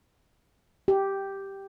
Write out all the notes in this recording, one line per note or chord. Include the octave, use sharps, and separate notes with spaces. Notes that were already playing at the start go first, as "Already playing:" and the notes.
G4